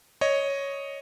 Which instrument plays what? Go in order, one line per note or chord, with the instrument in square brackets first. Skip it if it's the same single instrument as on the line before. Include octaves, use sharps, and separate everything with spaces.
[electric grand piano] C#5 D#5